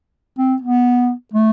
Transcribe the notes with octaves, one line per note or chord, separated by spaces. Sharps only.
C4
B3
A3